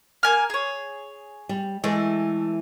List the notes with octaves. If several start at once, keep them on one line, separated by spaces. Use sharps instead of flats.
A#3 G#5 F6
G#4 C#5
G3
E3 G#3 A3